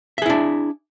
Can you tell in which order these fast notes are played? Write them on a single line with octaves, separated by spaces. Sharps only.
E5 G#4 E4 D4